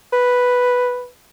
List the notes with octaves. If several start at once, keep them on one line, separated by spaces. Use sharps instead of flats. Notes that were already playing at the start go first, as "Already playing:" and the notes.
B4